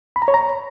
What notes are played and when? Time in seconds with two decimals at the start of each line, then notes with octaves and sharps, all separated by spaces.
0.16 B5
0.22 A#5
0.28 C#5
0.34 A#5